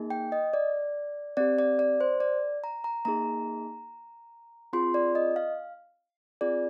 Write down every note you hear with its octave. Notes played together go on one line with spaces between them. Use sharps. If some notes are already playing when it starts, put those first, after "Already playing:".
Already playing: A#3 D#4 G#4
G5
D#5
D5
C4 G4 D5
D5
D5
C5
D5
A#5
A#5
A#3 D#4 G#4 A#5
C4 F4 G#4 C6
D5
D#5
F5
C4 F4 G#4 D5